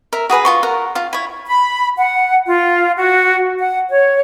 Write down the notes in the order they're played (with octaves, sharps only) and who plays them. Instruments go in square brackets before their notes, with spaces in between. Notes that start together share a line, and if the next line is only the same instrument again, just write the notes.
[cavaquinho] A#4 E5
F#4 G#4 B4 G#5
F4 C6 C#6
A#4 F#5
F4 F5
E4 C#5
[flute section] B5
F#5
F4
F#4
F#5
C#5